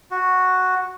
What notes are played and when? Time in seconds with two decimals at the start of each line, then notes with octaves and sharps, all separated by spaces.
0.11 F#4